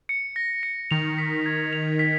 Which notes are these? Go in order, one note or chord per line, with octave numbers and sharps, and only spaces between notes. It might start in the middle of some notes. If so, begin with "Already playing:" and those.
C#7
A#6
C#7
D#3 F7
B6
G#6
F7
B6